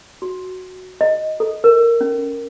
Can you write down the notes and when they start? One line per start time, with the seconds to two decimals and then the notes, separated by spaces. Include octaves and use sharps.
0.22 F#4
1.01 D#5
1.40 A4
1.64 A#4
2.01 C#4